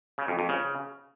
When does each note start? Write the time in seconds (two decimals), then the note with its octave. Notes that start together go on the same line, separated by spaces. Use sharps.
0.18 C#3
0.28 F2
0.39 F2
0.49 C#3